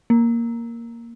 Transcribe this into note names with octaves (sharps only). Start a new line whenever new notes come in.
A#3